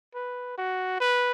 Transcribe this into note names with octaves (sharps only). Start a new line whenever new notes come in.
B4
F#4
B4